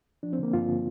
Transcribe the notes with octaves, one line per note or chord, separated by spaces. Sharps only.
F3 D4
C4
D3 A#3
G2 F4
D3